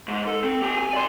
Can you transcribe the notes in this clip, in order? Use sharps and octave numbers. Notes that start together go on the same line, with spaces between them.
G#2
A4
C4
G4 G#5
G#5
D5 C6